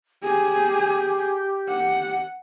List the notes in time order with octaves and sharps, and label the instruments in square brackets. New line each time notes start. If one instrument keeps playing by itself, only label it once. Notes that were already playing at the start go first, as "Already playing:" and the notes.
[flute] G4 [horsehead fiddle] G#4
[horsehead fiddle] F#5